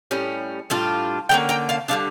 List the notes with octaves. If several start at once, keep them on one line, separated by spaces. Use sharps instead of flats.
A2 G3 C#4
A2 G3 D4 F4
D3 G3 A#3 C#4 G5 A#5
G5 A#5
F5 A5
D3 G3 D4 F5 A5